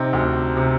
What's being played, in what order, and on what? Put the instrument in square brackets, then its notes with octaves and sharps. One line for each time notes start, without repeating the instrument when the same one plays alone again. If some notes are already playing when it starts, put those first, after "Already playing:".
Already playing: [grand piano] C3 C4 D#4
D2
C3